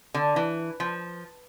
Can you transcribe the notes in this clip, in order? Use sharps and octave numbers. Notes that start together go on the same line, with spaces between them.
D3
E3
F3